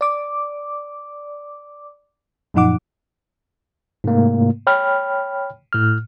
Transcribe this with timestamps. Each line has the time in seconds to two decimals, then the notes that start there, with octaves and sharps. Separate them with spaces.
0.01 D5 D6
2.54 F#2 A#2 F3 D#4 F#5 D6
4.04 G#2 C3 A3 A#3
4.67 C#5 G5 B5 F6
5.73 A2 F6